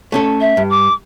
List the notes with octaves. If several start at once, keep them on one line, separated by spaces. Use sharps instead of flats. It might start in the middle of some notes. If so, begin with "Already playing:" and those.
A3 C#4 A4
E5
G2
D6